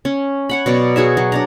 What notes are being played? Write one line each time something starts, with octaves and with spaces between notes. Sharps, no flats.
C#4
C#5 F#5 B5
B2 F#3 D5
F#4 G#4 C#5 E5
F#3
D4 D5 A#5